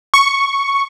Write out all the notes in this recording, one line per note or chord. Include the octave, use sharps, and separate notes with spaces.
C#6